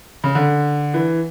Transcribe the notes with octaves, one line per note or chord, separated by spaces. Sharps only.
C#3
D3
E3